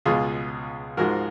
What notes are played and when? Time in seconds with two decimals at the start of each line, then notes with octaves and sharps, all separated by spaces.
0.06 C#2 B2 G#3 F4 G#4
0.97 G#2 F3 G#3 F#4 A#4